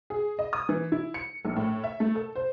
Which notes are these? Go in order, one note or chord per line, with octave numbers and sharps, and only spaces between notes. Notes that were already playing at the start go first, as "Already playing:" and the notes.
G#4
D#5
D#6
E3
E4
C#7
A#1
A2
E5
A3
A4
C5